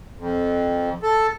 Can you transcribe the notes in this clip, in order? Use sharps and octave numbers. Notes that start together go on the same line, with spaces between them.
F2
A4